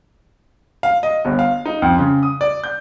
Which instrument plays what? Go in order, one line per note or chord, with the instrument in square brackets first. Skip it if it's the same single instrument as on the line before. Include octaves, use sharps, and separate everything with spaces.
[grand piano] F5
D#5
G1
F5
D#4
F2
C#3
D#6
D5
G6